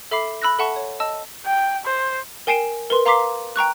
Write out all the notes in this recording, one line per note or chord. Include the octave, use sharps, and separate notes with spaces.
A4 E5 B5 D6 C7
B5 E6 F#6 A#6
A4 E5 F#5 A5 C#6
C#5
D#5 A5 E6
G5
C5
A#4 G5 G#5 C7 D7 E7
A#4 B4 C6
F5 A#5 C6 D6 B6 C7
G5 A#5 C#6 F#6